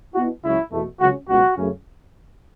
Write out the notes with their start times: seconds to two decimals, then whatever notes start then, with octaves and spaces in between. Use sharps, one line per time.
0.15 B2 B3 E4 F#4
0.43 C#2 C#3 F#3 C#4 E4
0.71 E2 B2 A3
1.00 C#2 C#3 F#3 C#4 F#4
1.28 C#2 B2 F#3 F#4
1.57 F#2 C#3 A3 C#4